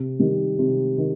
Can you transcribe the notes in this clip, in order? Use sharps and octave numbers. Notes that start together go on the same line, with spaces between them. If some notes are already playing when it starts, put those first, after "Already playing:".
Already playing: C3
D#3 G3
C3
D#3